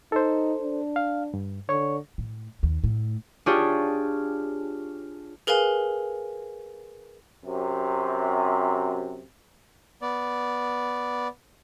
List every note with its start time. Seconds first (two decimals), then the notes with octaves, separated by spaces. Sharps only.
0.12 D#4 A4 C5
0.61 D4
0.96 F5
1.34 G2
1.69 D3 C#5 C#6
2.18 A2
2.63 D#2
2.84 A2
3.46 D4 F4 G4 G#4 C#5
5.47 G#4 A#4 B4 F5 G#5
7.45 F#2 C3
10.02 B3 D5